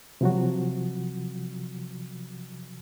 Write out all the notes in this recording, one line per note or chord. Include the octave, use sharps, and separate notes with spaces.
C3 F3 F#3 F#4